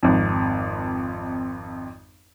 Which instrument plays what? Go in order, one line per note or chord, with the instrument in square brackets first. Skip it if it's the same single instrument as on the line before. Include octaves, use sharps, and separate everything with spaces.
[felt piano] G#1 F2